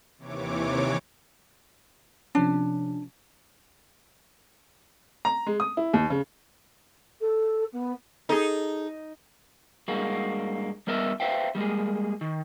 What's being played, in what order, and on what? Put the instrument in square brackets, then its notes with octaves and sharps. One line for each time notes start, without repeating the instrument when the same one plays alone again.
[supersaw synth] D#2 C3 E3 C#5 D6
[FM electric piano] C3 F3 C#4 [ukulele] D4
[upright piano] A#5
G#3
D#6
E4
D#2
C#3
[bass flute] A4
B3
[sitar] D#4 [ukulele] G#4 A4
[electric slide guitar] G2 G#3 A#3 F#4
G3 B3 A#4 D#5 E5
B4 C5 E5 F5 G5
G3 G#3 A#3 G#4
D#3